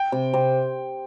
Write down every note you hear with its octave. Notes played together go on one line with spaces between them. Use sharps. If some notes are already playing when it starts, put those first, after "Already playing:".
Already playing: G5
C3
C3